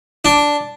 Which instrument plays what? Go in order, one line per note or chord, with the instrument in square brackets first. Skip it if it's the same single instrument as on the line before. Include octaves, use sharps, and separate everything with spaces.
[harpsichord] D4